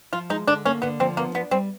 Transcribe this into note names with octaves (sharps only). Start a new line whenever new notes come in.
F3 F4
G#3 D#4
D3 D4
A#3 C#4
D3 B3
F3 C4
A#3 B3
B3 D4
G3 C4